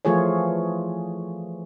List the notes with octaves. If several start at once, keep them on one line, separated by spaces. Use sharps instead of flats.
E3 F3 A3 F4 G#4 C#5